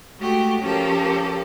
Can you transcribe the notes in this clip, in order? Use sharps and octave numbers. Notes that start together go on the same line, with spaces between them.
G#3 A3 F#4 G4
F3 C#4 G4 A4 A#4